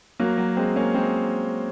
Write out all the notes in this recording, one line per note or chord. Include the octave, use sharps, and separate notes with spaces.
F#3 A#3
F#3
G#3 C4
A#3 C#4
G#3 C4